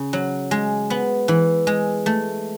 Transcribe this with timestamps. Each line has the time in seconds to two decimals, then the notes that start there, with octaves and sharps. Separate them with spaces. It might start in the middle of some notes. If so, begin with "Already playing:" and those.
Already playing: C#3
0.13 F#3
0.51 G#3
0.90 B3
1.28 E3
1.67 G#3
2.06 A3